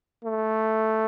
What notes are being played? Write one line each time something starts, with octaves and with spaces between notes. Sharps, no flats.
A3